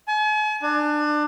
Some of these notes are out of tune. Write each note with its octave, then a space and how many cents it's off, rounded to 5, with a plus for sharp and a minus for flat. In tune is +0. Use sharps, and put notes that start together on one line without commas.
G#5 +45
D4 +25